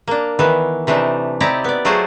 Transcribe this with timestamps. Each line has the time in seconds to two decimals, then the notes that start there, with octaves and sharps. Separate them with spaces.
0.07 A#3 D4
0.39 D#3 E3 B3
0.87 C3 E3 A3 D4 D#4
1.40 C4 D#4 E4 G4 D5 A#5
1.64 B3 D5
1.85 F#3 A3 F4 F#4 G#4 C5